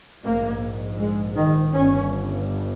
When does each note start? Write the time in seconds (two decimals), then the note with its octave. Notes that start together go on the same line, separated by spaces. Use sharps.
0.24 A#1 G#2 A#3
0.98 G#3
1.36 D#3
1.73 G1 G2 C#4